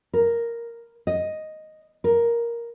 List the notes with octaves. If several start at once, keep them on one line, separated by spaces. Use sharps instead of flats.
A#4
D#5
A#4